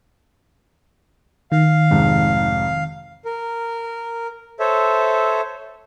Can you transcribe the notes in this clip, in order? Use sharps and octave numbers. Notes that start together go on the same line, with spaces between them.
D#3 F5
F1 G#2
A#4
A4 C5 C#5 E5